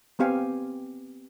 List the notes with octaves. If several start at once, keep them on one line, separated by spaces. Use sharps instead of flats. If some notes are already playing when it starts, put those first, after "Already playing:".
B3 C4 G4 F5 G#5